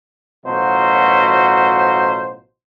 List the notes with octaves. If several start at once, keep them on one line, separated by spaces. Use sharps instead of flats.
A1 B2 F#3 F4 C5